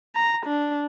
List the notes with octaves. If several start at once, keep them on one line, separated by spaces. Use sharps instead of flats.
A#5
D4